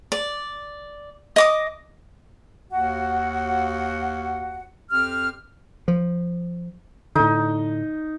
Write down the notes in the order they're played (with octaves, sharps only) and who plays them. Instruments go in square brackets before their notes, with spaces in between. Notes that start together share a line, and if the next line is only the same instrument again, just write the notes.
[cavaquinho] D5
D#5 D6 D#6
[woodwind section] D#2 F#4 F#5
F2 C4 G4 F6
[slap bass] F3
[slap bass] A2 D3 [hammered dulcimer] D#4